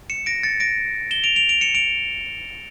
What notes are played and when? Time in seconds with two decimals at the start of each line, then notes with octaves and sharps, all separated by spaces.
0.10 C#7 E7
0.26 A#6 D7
0.43 A6 C#7
0.60 A#6 D7
1.11 E7 G7
1.23 D7 F7
1.36 D7 F7
1.49 D7 F7
1.61 C#7 E7
1.75 D7 F7